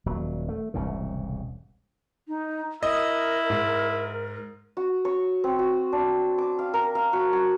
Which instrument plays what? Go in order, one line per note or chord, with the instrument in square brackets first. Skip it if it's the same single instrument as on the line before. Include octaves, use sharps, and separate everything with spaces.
[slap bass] D#1 F#3
A3
E1 C2 G#2 C#3
[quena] D#4
[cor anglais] E4 [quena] A#4 [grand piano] D#5
[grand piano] G#2
[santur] F#4
C#5
C4
F#4
D4
D6
F5
A#4
F5
F#4
F#4